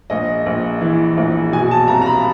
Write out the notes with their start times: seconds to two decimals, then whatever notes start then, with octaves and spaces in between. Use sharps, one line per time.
0.10 A#1 D#5
0.46 A#1
0.81 E3
1.17 A#1
1.52 B2 G#5
1.71 A5
1.88 C2 A#5
2.02 A#5
2.06 B5